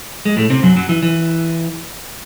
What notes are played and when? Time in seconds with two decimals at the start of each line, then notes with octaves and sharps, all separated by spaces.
0.25 G#3
0.37 A2 A3
0.50 C3 C4
0.63 F#2 F#3
0.76 F#2 F#3
0.89 E3
1.02 E3